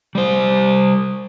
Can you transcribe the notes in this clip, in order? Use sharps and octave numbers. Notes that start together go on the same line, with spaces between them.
G3 C5